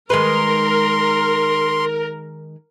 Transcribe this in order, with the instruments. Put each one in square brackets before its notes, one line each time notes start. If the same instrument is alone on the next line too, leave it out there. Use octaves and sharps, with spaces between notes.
[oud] D#3 G#3 B4 [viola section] A#4 [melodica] C6